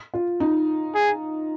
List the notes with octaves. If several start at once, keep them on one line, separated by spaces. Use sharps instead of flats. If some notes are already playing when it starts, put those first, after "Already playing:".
F4
D#4
G#4